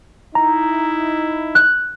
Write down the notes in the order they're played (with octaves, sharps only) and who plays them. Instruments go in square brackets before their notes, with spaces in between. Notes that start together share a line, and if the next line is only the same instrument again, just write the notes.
[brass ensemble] D#4 E4 [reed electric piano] A#5
[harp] F#6